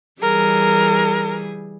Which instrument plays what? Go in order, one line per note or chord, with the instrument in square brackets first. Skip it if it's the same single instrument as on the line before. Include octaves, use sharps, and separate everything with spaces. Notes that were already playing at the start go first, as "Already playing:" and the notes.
[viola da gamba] E3 G3 G#4 [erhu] A#4